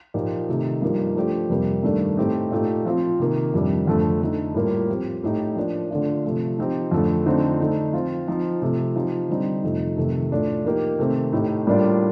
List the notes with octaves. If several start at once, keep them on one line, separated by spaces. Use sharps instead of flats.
A#2 F3 A#3 D#4 G4
C3 D#3 A3 D#4 G4
G2 F3 A#3 D#4 G4
F3 A3 D4 G4
F2 C3 G3 A#3
G2 D#3 A3 D4
A2 A3 C4 D#4 G4
A#2 A3 D#4 G4
F3 C4 F4
C3 D#3 A#3
F2 C3 D#3 G3 D4
F2 D3 A3
D3 A3 D#4
A2 G3 A#3 F4
F3 C4 G4
A2 A3 D#4 G4
F3 A#3 D4
D3 A3 D4 F4
C3 F3 A3
F3 C4 D#4 G4
F2 D3 A3
D3 F3 A3 C4 D#4
D3 A3 D#4
F3 C4 F4
F3 C4 D#4
C3 F3 A3
F3 C4 D#4 G4
D3 G3 C4 D#4
F2 C3 F3 A3 D#4
F2 C3 D#3 A3
A2 A3 D4 F4
F3 A#3 D#4 G4
C3 D#3 A3 C4
A2 A3 D#4 G4
A2 G3 A#3 D4 F4